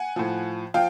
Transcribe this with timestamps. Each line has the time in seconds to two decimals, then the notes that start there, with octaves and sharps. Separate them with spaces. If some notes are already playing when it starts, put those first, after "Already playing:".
Already playing: F#5 G#5
0.16 A2 F3
0.74 F3 F5 G5